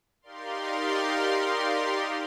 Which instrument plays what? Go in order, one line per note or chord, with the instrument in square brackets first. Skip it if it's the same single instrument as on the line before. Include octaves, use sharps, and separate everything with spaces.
[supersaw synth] D#4 G4 A#4 D5 F5 C6